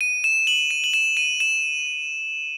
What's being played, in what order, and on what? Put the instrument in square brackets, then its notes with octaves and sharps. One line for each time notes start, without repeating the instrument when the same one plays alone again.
[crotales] D#7
E7
F#7
D#7
F#7
E7
D#7
E7